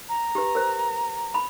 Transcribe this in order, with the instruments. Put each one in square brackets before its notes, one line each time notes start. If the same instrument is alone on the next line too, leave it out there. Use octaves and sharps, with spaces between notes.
[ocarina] A#5
[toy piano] G4 B4
A#4 C5
B5